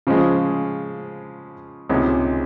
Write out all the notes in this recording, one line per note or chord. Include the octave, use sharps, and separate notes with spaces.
C#3 F3 G#3
C#2 C3 D#3 G#3